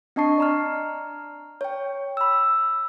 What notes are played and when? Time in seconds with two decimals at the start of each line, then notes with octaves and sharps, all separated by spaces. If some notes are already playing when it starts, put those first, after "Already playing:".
0.16 C4 D4 D#5 A5 C#6 C7
0.38 D5 A#5 F6
1.61 C#5 G5
2.17 B5 E6